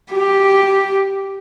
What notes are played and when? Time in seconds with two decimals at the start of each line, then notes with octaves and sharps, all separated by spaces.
0.12 G4